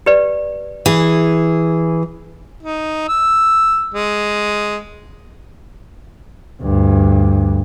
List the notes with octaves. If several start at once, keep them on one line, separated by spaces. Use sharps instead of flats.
G4 B4 D5
E3 G#4
D#4
E6
G#3
D2 G2